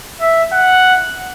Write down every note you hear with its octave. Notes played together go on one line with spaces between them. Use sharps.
E5
F#5